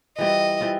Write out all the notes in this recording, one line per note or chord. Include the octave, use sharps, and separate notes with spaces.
E3 G3 C4 F4 D#5
E3 G3 C4 F4